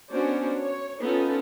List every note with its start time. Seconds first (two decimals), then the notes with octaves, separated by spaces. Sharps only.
0.11 B3 C#4 D4 F#4 C5 C#5
0.57 C#5
1.03 B3 C#4 D#4 F4 A4